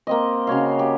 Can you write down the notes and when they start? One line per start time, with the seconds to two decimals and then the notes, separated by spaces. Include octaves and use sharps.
0.07 A#3 C4 D#5
0.47 C#3 F#4 C#5 F5
0.79 G4